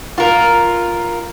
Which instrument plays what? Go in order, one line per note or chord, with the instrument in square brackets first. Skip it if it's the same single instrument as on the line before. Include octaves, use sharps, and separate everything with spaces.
[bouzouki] F4 A#4